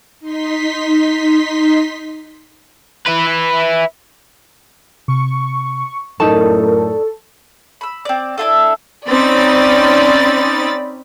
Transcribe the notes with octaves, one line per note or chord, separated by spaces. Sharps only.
D#4 C6 B6
E4 B4
C3 C#6
F#2 A2 D#4 A4 A#4 D5 A5 C#6
B5 E6
C4 D5
D4 E4 F4 A4
C4 C#4 D#4 D5 B5 A6